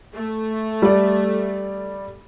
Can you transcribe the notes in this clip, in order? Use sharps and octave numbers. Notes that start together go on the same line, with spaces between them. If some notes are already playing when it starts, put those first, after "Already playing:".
A3
G3 D5